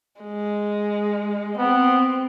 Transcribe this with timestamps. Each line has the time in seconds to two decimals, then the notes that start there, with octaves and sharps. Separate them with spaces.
0.21 G#3
1.58 B3 C4